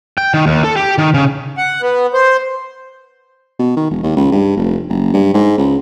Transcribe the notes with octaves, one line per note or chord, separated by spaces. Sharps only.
G5
D#3
D#2
A4
G4
D#3
C#3
F#5
B3
C5
B2
D#3
E1
D#2
C#2
G2
F1
F#1
G2
G#2
C#2